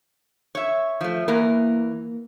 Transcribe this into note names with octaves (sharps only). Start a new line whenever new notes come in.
C#5 E5
F3 A3
E2 E3 A#3 A#4